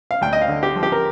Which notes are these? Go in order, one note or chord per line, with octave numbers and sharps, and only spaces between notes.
F5
D2 G5
D#5
F5
D3
G4
F3
G4
A#4